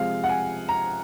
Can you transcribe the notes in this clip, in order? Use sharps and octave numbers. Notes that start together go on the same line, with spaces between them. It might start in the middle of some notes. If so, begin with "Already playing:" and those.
Already playing: C3 F3 G#3 F5
F#5
G#5
A#5